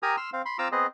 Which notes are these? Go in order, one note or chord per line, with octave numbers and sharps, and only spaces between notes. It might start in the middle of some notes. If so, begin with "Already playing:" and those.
G4 A#4 G#5 A#5 D#6
C6 E6 F6
C4 F5
B5 C6
C4 F4 A#5 D6 E6
B3 C4 G#4 D#5